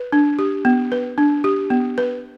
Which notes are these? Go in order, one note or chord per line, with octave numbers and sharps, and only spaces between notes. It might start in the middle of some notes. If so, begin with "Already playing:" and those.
Already playing: B4
D4
G4
B3
B4
D4
G4
B3
B4